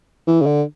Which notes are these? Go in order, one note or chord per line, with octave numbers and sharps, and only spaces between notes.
E3
C#3
D3